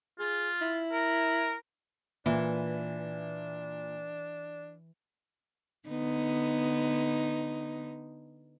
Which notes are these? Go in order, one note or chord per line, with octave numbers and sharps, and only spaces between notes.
F4 G#4
E4
A#4
A#2 E3 D4
D3 B3 D#4